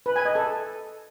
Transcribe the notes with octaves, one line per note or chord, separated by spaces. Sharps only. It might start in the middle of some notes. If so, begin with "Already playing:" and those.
B4
G#5
D#5
A4